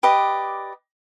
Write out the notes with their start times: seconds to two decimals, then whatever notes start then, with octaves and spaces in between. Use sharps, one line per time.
0.03 G4 B4 D5 D#5